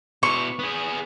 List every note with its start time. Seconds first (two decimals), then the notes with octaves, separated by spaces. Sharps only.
0.23 B2 E4 C#6
0.59 B3 G#4